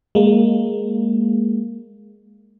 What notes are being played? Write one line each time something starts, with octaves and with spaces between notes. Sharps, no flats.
G#3 A#3